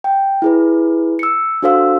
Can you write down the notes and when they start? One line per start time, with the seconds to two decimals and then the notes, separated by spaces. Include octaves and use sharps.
0.04 G5
0.42 E4 G#4 B4
1.19 E6 C#7
1.63 D4 F#4 A4 C5 F5 E6